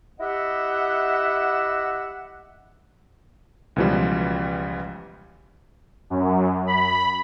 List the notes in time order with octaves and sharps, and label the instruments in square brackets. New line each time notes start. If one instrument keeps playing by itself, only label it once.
[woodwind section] E4 G4 D#5 E5 F#5
[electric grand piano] C#2 B2 E3 F3 G3
[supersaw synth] F#2
B5